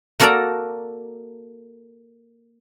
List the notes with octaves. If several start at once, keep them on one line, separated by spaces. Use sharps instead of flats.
A#3 F#4 A4 A#4 D5 A#5